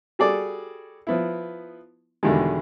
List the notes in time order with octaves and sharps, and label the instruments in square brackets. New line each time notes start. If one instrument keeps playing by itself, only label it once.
[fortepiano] G3 F#4 G#4 A4 D5
F3 B3 E4
E2 B2 D3 D#3 G3 G#3